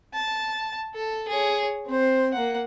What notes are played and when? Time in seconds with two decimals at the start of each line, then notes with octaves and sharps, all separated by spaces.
0.14 A5
0.95 A4
1.28 G#4 C#5
1.86 C4 C5
2.33 A#3 F#5